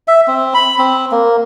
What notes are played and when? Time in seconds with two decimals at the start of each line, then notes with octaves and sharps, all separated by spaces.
0.08 E5
0.27 C4
0.54 B5
0.78 C4
1.12 A#3